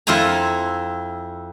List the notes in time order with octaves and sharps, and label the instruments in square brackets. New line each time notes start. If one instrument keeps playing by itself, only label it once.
[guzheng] F2 E4 F4 G#5 A#5